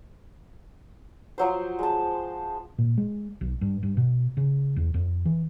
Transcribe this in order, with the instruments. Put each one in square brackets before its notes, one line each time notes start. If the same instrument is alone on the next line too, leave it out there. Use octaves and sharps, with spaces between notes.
[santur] F3 F#3 C5
G#3 A5
[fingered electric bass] A#2
G#3
B1
G2
G2
B2
C#3
E2
F2
E3